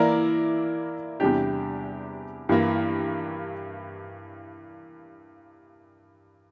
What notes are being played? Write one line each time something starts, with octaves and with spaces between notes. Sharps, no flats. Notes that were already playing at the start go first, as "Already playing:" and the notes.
Already playing: E3 A#3 E4 A#4 D5
E2 C3 G3 D4 G4
G2 E3 A#3